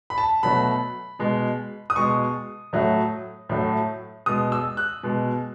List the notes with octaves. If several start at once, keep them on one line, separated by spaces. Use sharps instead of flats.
B5
A5
B2 F#3 A3 B5
B2 G#3
D#6
B2 G#3 C#6
A2 F#3 A3
A2 F#3 A3
B2 G#3 D#6
E6
F#6
B2 G#3